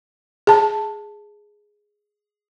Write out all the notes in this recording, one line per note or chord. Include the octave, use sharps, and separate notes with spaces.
G#4 A5